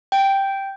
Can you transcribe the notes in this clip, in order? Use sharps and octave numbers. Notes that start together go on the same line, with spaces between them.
G5